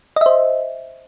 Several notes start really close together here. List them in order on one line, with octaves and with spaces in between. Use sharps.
D#5 E5 C5